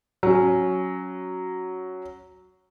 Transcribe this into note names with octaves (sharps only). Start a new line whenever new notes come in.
F#3 C#4